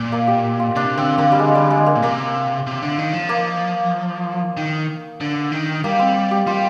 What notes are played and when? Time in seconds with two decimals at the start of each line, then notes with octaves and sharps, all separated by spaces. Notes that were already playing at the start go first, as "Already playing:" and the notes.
Already playing: A#2
0.12 A#3
0.28 G4
0.60 F4
0.76 C3 D4
0.97 D3 C4
1.18 D3 A#3
1.32 G3
1.39 G#3
1.55 G3
1.70 G#3
1.86 A#3
1.96 A#2
2.02 C3 A#3
2.67 C3
2.82 D3
2.98 D#3
3.13 F3
3.29 A#3
4.57 D#3
5.21 D3
5.52 D#3
5.84 G3 A#3
5.99 C4
6.31 G4
6.47 G3 F4